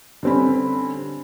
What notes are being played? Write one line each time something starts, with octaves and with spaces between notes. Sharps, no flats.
D3 G3 C4 C#4 B5